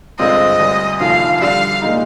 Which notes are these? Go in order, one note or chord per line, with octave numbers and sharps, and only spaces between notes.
G2 D3 G#3 C4 F4 D#5
D2 D3 G3
F1 D#2 D3 F3 F5
D3 G3 D4 F5
A#2 G#3 D#4